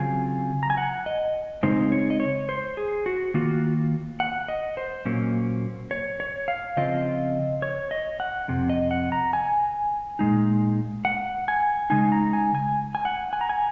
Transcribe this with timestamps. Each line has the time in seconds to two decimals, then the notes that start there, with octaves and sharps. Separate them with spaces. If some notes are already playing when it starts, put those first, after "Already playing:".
Already playing: C#3 F#3 C4 F4 G#5
0.63 A#5
0.70 G#5
0.77 F#5
1.06 D#5
1.63 C#3 G#3 C4 D#4 C5
1.92 C#5
2.10 D#5
2.20 C#5
2.49 C5
2.77 G#4
3.06 F#4
3.34 D#3 A#3 F4 F#4
4.20 F#5
4.48 D#5
4.77 C5
5.05 A#2 F#3 A#3 C#4
5.91 C#5
6.20 C#5
6.48 F5
6.77 C#3 F3 C4 F4 D#5
7.62 C#5
7.91 D#5
8.20 F#5
8.48 F2 C3
8.70 D#5
8.91 F#5
9.12 A#5
9.33 G#5
10.19 A#2 G#3 D#4
11.05 F#5
11.48 G#5
11.90 C#3 G#3 D#4 G#5
12.12 A#5
12.33 G#5
12.55 G#5
12.95 G#5
13.05 F#5
13.33 G#5
13.41 A#5
13.49 G#5